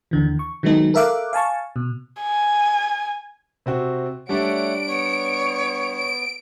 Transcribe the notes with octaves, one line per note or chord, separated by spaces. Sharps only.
D#2 D3 E3
C#6
D#3 F#3 G#3 B3 D#4 A4
A4 A#4 E5 F5 D6 F#6
F5 G#5 A5 C#6
B2
G#5
C3 C4 F#4
G3 A3 D4 C#5 F#5 D7
B3 C#5
D7